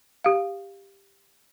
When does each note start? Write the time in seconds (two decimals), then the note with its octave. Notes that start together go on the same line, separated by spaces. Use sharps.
0.24 G4 F5